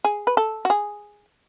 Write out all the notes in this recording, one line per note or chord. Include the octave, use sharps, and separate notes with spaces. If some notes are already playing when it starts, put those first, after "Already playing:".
G#4
B4
A4
F#4
G#4